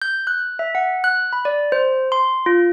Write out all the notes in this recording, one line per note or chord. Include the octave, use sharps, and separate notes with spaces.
G6
F#6
E5
F#5
F#6
B5
D5
C5
C6
F4